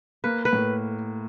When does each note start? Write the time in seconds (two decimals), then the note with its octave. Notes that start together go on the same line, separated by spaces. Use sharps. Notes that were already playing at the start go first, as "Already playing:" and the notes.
0.24 A#3 B4
0.45 B4
0.53 A2